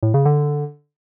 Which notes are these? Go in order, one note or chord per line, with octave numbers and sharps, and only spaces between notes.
A2
C#3
D3